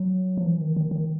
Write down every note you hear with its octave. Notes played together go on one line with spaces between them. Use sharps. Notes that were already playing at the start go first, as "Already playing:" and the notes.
Already playing: F#3
F3
E3
D#3
D#3
D#3